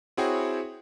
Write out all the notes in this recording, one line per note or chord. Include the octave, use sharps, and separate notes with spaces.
C4 E4 F#4 G#4 C#5 G5